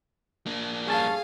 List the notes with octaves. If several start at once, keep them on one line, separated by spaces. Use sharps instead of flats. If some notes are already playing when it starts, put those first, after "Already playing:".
A#3 D4
G2 C#4 G#4 F5 A5